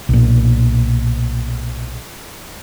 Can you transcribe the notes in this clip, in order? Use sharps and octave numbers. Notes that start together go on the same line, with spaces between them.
B1 A#2